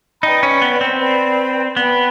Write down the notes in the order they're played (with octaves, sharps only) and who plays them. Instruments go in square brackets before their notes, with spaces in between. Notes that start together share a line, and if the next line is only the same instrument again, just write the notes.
[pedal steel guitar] D#4 [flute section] B4 D5 G5 B5
[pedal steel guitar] C#4
B3
C4
[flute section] B4 D5 G5 B5
[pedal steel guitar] B3 [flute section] B4 D5 G5 B5